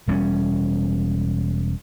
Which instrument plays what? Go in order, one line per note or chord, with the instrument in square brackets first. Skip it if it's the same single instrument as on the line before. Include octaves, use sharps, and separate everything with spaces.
[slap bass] E1 G3 A3 C#4